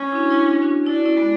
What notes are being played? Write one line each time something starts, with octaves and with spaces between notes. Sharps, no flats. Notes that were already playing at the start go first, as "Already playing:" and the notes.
Already playing: C#4
E4
D4 F#4
E4
D4 F#4
D4 F#4
D4 E4
F#4
C#4 E4
G#3 B3